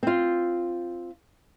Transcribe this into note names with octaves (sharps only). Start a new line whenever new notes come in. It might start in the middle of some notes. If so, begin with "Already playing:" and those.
C4 F4